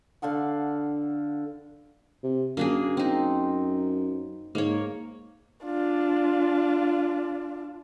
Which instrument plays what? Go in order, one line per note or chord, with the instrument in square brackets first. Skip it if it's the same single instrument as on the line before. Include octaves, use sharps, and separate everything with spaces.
[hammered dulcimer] D3 A4 F5 F#5
[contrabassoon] C3
[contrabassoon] F#2 [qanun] A#3 D4 G#4
[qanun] C4 D#4
[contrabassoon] G#2 [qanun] A#3 C#5
[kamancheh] D4 F4